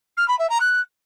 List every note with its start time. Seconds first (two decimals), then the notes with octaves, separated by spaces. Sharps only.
0.17 F6
0.28 B5
0.39 E5
0.50 A#5
0.60 F#6